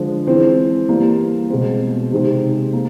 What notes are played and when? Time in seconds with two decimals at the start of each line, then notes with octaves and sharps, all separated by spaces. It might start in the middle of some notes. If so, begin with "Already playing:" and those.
Already playing: D3 F3 G#3
0.26 E3 G#3 C4
0.88 E3 G3 A#3
1.50 B2 G#3 C4
2.12 C3 D#3 G#3 C4
2.73 A#3